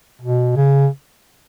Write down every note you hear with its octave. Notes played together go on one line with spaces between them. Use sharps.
B2
C#3